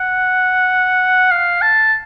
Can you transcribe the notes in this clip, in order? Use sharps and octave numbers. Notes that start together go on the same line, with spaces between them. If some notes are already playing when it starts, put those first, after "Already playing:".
Already playing: F#5
F5
A5